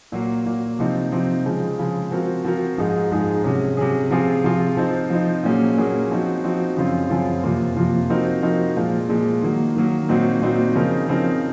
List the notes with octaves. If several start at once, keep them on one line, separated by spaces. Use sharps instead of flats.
A#2 F#3 A#3
A#2 F#3 A#3
C3 F3 C4 D#4
C3 F3 C4 D#4
C#3 F3 G#3
C#3 F3 G#3
F3 C4 F#4 A#4
F3 C4 F#4 A#4
G#2 F3 G#3 D#4 G#4
G#2 F3 G#3 D#4 G#4
C3 F#3 C#4 G#4
C3 F#3 C#4 G#4
C3 F3 C4 F4 G#4
C3 F3 C4 F4 G#4
F3 C4 D#4
F3 C4 D#4
A#2 F#3 A#3 C#4 G#4
A#2 F#3 A#3 C#4 G#4
F3 C4 D#4 F#4
F3 C4 D#4 F#4
F#2 C#3 F3 C4 F4
F#2 C#3 F3 C4 F4
F2 C3 F3 A#3 F4
F2 C3 F3 A#3 F4
F3 C4 D#4 F#4 A#4
F3 C4 D#4 F#4 A#4
A#2 F3 G#3
A#2 F3 G#3
D#3 F#3 A#3
D#3 F#3 A#3
A#2 F#3 C4 D#4 F#4
A#2 F#3 C4 D#4 F#4
C#3 F3 C4 D#4 A#4
C#3 F3 C4 D#4 A#4